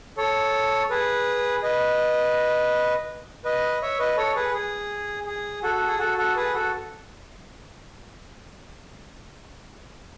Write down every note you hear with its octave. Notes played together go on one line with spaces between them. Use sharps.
A4 C#5
G#4 B4
B4 D#5
B4 D#5
C#5 E5
B4 D#5
A4 C#5
G#4 B4
G#4
G#4
F#4 A4
F#4
G#4
F#4 A4
F#4 A4
G#4 B4
F#4 A4